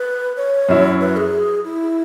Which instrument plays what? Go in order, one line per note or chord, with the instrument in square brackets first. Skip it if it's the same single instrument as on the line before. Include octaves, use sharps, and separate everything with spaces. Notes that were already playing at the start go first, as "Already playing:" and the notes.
Already playing: [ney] B4
C#5
[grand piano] F#2 F#3 E4
[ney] B4
G#4
E4